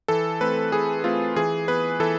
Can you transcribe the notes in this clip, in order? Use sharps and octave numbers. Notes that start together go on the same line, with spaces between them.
E3 A4
A3 C4 B4
E3 G#4
A3 C4 F4
E3 G#4
B3 B4
E3 A4